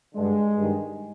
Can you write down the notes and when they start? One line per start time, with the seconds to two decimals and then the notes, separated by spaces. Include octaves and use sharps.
0.15 G2 D3 G#3
0.58 G2 D#3